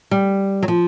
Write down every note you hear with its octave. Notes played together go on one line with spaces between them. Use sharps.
G3
F#3
F3